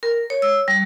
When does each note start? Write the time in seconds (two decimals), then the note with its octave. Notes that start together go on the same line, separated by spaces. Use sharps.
0.03 A#4
0.30 C#5
0.42 E6
0.68 G3